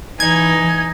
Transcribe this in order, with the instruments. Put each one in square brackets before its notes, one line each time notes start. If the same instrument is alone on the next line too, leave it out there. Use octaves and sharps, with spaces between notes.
[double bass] E3 [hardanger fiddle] D#4 [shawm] G#5 [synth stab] G#6